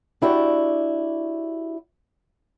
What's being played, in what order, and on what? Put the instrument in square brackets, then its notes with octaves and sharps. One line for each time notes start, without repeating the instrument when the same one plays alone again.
[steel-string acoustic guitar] D4 E4 F#4 G4 D5